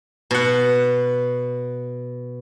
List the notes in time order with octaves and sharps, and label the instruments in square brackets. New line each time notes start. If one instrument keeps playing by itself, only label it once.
[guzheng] B2 F#5